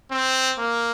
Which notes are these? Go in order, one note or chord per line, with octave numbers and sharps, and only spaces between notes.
C4
A#3